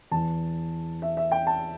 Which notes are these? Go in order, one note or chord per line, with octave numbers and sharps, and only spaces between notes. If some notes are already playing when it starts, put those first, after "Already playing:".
E2 E3 A5
E5
E5
G5
A5